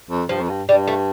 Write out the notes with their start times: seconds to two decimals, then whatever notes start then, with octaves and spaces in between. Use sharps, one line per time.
0.10 F2
0.29 G2 F3
0.40 F2
0.49 G2
0.68 G2 G3
0.88 A3